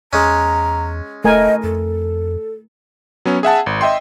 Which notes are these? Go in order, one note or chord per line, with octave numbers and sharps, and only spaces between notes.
E2 G#3 C#4 A#5
E1 A3 A#4 D#5 G#5
F2 A4
F#3 B3 C#4
G#4 E5 F#5 A5
G#1
D#5 E5 G5 C6